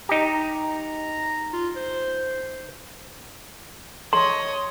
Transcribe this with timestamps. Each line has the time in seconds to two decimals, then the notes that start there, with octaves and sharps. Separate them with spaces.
0.09 D#4 G4 A#5
1.53 F4
1.76 C5
4.13 C#5 D#5 C6